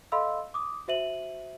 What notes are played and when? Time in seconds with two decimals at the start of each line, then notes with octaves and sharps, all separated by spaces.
0.12 A4 D#5 F5 B5 C6 E6
0.54 D6 D#6
0.88 F#4 C5 E5 D#7 F#7